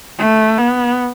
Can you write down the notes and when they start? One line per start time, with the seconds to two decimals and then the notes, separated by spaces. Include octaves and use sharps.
0.18 A3
0.57 B3